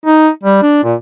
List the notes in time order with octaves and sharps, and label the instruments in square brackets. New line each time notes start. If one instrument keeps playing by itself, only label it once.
[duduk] D#4
G3
D4
A#2